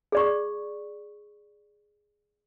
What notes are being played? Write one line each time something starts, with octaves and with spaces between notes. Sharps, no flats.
G#4 D5 C#6